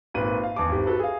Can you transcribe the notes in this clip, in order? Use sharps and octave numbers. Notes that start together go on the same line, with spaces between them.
G#1 A#2 B4 D#7
F5
E2 A5 D6
G#1 G4
F#4 A4 B4
G#4 F5